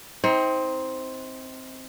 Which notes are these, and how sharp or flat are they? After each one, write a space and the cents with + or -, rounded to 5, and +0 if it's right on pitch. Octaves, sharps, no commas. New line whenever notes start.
C4 +0 D#4 +35